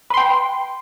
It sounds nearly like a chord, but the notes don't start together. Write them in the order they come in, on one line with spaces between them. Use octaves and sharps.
B4 C6 G5